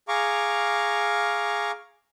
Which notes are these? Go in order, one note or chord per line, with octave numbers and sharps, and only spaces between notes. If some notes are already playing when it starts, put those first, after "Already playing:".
G#4 F5 A#5 C#6 D6